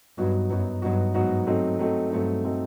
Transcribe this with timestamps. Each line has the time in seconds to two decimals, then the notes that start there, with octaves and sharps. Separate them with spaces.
0.18 G2 F#3 B3 D#4 F#4
0.50 F#2 F#3 B3 D#4 F#4
0.82 G2 F#3 B3 D#4 F#4
1.14 G#2 F#3 B3 D#4 F#4
1.47 F#3 A3 C4 D#4
1.79 F#3 A3 C4 D#4
2.11 G2 F#3 A3 C4 D#4
2.44 F#3 A3 C4 D#4